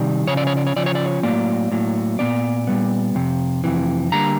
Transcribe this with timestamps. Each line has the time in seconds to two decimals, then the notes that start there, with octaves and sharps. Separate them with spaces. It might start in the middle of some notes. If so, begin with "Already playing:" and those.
Already playing: C3 D#3 G3 D5
0.28 C#3 F3 C#4 C#5
0.37 D5
0.47 C#5
0.57 D5
0.67 C#5
0.76 C#3 F3 C#4 D5
0.86 C#5
0.95 D5
1.06 C#5
1.23 A2 F#3 A#3 D5
1.72 A2 F#3 A#3
2.19 A#2 G3 B3 D5
2.67 A#2 G3 B3
3.15 F2 C3
3.64 F2 C3 E3
4.12 D3 G3 A#3 A#5